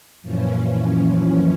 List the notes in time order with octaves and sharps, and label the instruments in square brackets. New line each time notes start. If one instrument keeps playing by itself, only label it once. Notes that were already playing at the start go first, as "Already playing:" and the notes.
[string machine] F#2 A#2 E3 F3 C#4